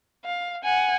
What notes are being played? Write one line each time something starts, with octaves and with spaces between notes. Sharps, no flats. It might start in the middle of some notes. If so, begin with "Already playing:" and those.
F5
F#5 G#5